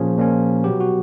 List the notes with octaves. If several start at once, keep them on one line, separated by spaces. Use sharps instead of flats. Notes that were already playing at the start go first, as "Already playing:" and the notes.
Already playing: A#2 F3 A#3 C#4 G#4
A#2 F3 A#3 C#4
B2 F#3 B3 G4
F#4